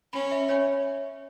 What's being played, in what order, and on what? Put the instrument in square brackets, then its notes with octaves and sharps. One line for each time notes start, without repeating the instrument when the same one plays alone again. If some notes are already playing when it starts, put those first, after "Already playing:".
[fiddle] C#4 [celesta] B5
[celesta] E5
C#5